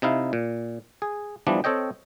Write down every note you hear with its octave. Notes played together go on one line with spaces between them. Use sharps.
C3 D#4 E4 F5
A#2
G#4
E3 F3 G3 B3 D4
C4 A4 C#5 D#5 G5